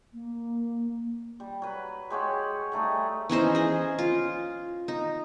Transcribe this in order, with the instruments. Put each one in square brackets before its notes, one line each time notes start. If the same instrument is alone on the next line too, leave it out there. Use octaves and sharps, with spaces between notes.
[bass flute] A#3
[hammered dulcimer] G3
F#3 B4
G#3 G4 C#5 F#5
G3 A3 D#4 G#4
[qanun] E3 C#4 D#4 C5
G#4 D#5
F4
D#4